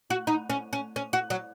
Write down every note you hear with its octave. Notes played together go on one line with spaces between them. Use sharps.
F#4
D#4
C#4
C#4
C#4
F#4
F#3